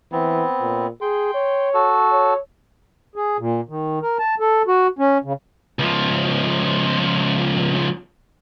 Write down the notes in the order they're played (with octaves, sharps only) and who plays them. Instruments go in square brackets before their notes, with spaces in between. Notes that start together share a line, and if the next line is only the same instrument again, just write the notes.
[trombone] E3 [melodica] B3 C4
[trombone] A#2
[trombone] G#4 [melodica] G5 C6
[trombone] C#5
[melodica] F#4 A4
[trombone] C#5
[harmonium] G#4
A#2
D#3
A#4
A5
A4
F#4
C#4
C#3
[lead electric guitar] C#2 F3